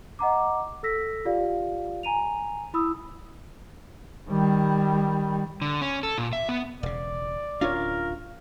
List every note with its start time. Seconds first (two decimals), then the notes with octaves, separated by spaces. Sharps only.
0.19 D#5 F#5 A#5 D6
0.83 A4 E6 A#6 B6
1.25 F4 G4 D5 F5
2.03 G#5 A#5 D#7 F7
2.74 E4 B5 D#6 E6
4.30 D#3 G3
5.62 D3
5.81 C#4
6.03 A4
6.18 A#2
6.33 E5
6.49 B3
6.83 E1 C#3 D5
7.61 D1 C#4 D4 F4 A#4 C#5